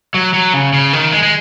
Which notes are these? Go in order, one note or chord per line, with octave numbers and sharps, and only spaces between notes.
F#3
F#3
C#3
C#3
D#3
G#3
G#3